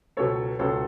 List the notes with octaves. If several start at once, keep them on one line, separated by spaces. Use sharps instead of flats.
C#2 B2 F#3 A4 C#5
C#2 B2 F#3 A4 C#5